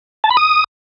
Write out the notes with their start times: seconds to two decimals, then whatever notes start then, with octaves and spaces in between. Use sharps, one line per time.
0.24 A5
0.30 B5
0.37 D#6